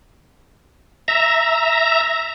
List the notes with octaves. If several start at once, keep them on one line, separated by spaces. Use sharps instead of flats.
E5 A#5